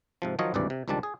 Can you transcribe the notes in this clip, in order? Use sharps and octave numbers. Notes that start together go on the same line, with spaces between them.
G#2 C3 F3
D#3 F3 F#3 F4 C#5 D#5
G#1 D2 G2 C3 E3 D5
C3
C#2 D#3 F3 G3 D4 A5
G#4